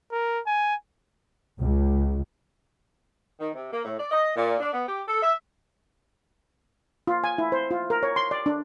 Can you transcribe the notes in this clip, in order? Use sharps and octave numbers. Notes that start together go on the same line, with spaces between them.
A#4
G#5
C#2
D#3
C3
A#3
A2
D5
D#5
A#2
D4
B3
G4
A4
E5
F4
G#5
E4
C5
F4
A#4
C#5
C6
D5
D4